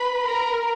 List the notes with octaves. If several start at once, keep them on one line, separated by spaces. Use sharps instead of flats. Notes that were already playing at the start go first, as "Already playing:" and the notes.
Already playing: B4 B5
A#4 A#5